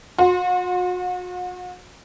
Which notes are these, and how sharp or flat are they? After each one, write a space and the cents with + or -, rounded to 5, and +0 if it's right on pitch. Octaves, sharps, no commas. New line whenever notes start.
F#4 -40 C6 +10